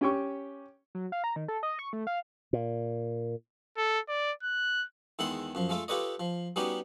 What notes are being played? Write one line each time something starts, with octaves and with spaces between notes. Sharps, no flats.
C#4 G4 G5 C#6
F#3
F5
A#5
D#3
A4
D#5
C#6
A3
F5
A#2
A4
D5
F#6
E2 D#3 G#3 E4 F#5 C6
F#2 F3
G#3 A3 F4 A4
F4 G4 A4 B4 C#5 D#5
F3
G3 B3 C#4 D#4 F#4 G4